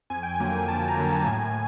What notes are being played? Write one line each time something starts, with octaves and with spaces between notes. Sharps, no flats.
F2 G#5
G5
D3 F#3 A#3 G#5
F2 A5
A#5
D3 F#3 A#3
A5
A2 G#5